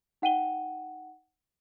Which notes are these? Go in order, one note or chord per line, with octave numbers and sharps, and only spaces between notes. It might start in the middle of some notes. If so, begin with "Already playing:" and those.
D#4 F#5 G5 D#7 G7